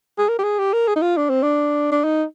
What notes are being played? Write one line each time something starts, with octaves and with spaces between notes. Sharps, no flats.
G#4
A#4
G4
G#4
G4
A#4
G#4
D#4
F4
D4
C4
D4
D4
D#4